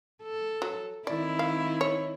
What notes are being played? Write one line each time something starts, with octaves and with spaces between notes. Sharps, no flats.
A4
F#3
D#3 C4 E4 D5
F5
C#5